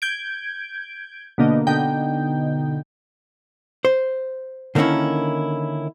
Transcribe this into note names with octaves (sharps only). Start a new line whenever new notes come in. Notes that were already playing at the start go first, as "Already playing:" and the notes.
G6 G#6 D7
B2 D3 A#3 D#4
B2 D3 D#4 G5
C5
D3 D#3 A#3 C4 C#4 E4